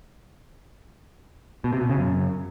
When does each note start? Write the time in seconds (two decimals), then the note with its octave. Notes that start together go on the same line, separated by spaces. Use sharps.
1.64 B2
1.73 C3
1.81 B2
1.90 C#3
1.98 F#2